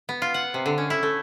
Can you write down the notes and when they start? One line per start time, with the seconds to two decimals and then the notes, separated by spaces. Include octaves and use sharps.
0.09 B3
0.22 F4
0.34 F#5
0.54 C3
0.66 D3
0.78 C#4
0.90 E4
1.03 A3